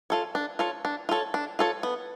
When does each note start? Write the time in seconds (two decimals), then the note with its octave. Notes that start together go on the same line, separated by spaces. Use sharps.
0.10 F4 A4 C#5
0.35 D4
0.59 F4 A4 C#5
0.85 D4
1.09 F4 A4 C#5
1.34 D4
1.59 F4 A4 C#5
1.83 B3